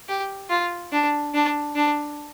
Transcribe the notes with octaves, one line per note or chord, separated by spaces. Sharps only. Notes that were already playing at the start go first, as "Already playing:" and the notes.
G4
F4
D4
D4
D4